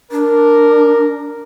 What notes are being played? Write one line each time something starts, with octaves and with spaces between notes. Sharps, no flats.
D4 A#4